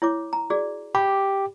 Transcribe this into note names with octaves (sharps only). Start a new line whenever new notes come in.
E4 C#5 D6
A#5
F#4 G#4 D5
G4 B5 D6